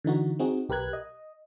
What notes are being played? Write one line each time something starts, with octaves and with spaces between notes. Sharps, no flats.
D3 E3 D#4 F#4
C4 D#4 F#4 G#4
B1 G4 A#4 B4 F#6 G#6
D#5